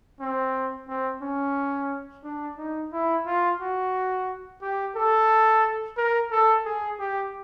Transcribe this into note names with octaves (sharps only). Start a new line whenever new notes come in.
C4
C4
C#4
D4
D#4
E4
F4
F#4
G4
A4
A#4
A4
G#4
G4